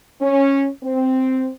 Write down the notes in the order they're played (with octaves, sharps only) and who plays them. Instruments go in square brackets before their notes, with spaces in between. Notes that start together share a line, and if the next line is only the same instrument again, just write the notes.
[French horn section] C#4
C4